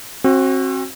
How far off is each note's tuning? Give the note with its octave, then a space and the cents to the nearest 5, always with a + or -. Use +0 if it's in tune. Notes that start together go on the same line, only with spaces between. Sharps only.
C4 +35 F#4 +0